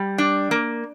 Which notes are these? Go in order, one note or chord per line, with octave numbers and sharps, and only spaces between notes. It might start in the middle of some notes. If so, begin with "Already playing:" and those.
Already playing: G3
D4
A#3